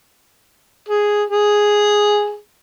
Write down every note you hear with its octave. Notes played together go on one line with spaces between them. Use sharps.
G#4
G#4